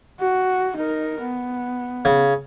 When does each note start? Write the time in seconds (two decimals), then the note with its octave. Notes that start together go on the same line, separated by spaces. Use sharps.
0.20 F#4
0.76 D#4 A#4
1.21 B3
2.05 C#3